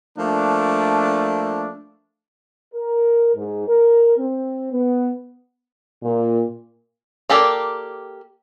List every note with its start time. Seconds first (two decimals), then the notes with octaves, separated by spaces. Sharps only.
0.18 F3 A3 A#3 D4
2.75 A#4
3.35 G#2
3.68 A#4
4.17 C4
4.72 B3
6.03 A#2
7.30 A#3 G4 A4 A#4 D5